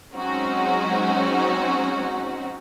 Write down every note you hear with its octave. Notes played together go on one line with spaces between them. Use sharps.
F#3 G#3 C4 C#4 D#4 F#4